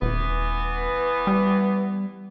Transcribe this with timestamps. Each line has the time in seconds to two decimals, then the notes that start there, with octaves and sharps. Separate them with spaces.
0.02 D#1 E3 B3
1.27 G3